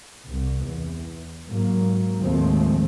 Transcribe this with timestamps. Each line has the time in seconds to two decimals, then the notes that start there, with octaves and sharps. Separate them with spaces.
0.27 C2
0.65 E2
1.47 G#2 F#3 A#3
2.19 D#2 A2 F3 G#3 A3 C4